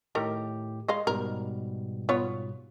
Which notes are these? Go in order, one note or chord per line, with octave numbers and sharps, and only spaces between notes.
A2 D#3 G4 A4 A#4
G#3 D#5 F5
G#2 B2 G3 A#4
B3 F4 C#5